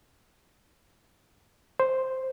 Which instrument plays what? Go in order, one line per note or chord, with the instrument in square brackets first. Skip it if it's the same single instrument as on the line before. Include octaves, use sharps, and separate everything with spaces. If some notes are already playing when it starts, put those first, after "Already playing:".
[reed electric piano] C5